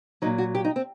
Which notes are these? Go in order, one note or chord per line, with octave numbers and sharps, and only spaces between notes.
A#2 F#3 D#4
F#4
G4
D#4
C4